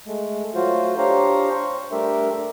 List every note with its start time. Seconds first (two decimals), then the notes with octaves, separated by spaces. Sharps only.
0.07 G#3 A3
0.55 F#3 A3 F4 F#4 C5
0.98 D4 G4 C5 C#5 F5 A#5
1.51 C5 C#6
1.92 G3 A3 D4 G4 A#4 E5